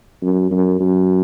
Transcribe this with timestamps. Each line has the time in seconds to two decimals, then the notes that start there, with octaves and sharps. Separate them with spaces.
0.22 F#2
0.51 F#2
0.81 F#2